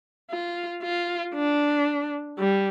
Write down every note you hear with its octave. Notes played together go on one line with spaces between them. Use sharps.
F4
F4
D4
G3